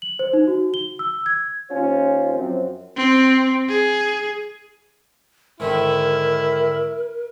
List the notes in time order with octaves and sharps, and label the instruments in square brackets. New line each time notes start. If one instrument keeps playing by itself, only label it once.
[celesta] F#7
C5
D#4
F#4
G7
E6
G#6
[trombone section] D#2 C#4 F4 C5
F#2 F3 C4
[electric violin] C4
G#4
[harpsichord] G#2 D3 D#3 [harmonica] E4 [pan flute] A#4